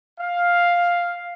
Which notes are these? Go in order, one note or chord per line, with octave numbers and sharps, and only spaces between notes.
F5